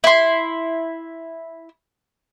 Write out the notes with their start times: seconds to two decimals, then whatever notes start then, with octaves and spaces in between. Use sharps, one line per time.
0.04 E4 C6